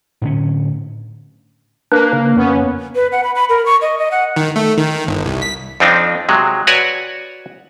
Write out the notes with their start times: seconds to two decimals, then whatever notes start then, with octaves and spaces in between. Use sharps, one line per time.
0.22 A2 D3 C#4
1.92 A#3 D4 B4
2.13 C#3
2.36 F2 B3 C#4
2.95 B4
3.12 F#5
3.24 B5
3.35 B5
3.50 A#4
3.66 C#6
3.82 D#5
3.98 D#5
4.11 F#5
4.36 D#3
4.56 A3
4.78 D#3
5.07 G1
5.26 C2
5.42 B6
5.80 F2 F3 C4 D4 D#4
6.29 C3 F#3 G#3
6.67 F#4 B4 C#5 D5 F#5 G#5